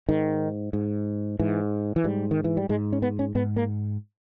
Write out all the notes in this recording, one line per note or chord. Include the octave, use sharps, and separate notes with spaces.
G#2 D#3
G#2
G#2 E3
E3
G#2 G3
D#3
E3
G3
G#2 G#3
C#4
B3
C#4
G#2 B3
A#3